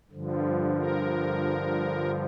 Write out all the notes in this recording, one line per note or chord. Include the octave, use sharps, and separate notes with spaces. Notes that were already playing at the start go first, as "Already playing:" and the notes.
G2 D3 F3
A#4